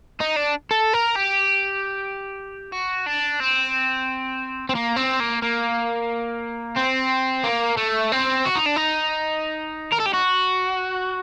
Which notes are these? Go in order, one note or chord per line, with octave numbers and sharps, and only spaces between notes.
D#4
D4
A4
A#4
G4
F#4
D4
C4
C4
A#3
C4
A#3
A#3
C4
A#3
A3
C4
F#4
D#4
D4
D#4
A#4
A4
G4
F#4